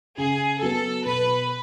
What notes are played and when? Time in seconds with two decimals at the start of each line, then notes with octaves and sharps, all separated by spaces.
0.18 C#3 G#4
0.62 F#3 B3 A4
1.06 B2 B4